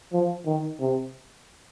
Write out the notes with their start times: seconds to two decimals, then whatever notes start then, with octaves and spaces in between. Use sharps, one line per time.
0.13 F3
0.46 D#3
0.80 C3